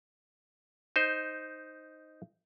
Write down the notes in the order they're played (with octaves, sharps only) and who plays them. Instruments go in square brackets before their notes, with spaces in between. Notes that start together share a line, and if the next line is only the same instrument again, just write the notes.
[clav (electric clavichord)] D#4 C5